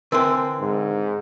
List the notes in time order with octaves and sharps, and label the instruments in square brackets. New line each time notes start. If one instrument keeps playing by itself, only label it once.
[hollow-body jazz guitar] D3 E3 C4 [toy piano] A#4
[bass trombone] G#2